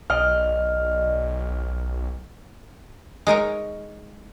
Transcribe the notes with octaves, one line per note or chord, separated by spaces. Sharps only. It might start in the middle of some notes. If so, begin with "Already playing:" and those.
B1 D5 D#5 F6
G#3 D#4 A#4 C#5